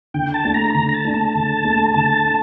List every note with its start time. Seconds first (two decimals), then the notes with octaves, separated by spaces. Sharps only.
0.14 D3 G5
0.34 A5
0.45 A3 D4
0.54 A#5
0.74 D3 A#5
0.89 A#5
0.94 A5
1.05 A3 D4
1.14 A5
1.35 D3
1.65 A3 D4
1.94 D3 A5
2.25 D4